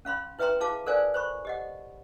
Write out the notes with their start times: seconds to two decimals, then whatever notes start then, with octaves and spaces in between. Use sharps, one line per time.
0.05 C#4 F5 B5 C6
0.39 E4 B4 E5 G5 A#5 C6
0.60 E4 F#4 G#4 F5 A5 D6
0.86 A4 A#4 C5 D5 F5 G#5
1.14 C5 B5 C#6
1.45 G4 D#5 F#5